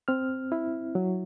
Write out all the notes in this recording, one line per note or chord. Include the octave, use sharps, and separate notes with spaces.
C4 F6
E4
F#3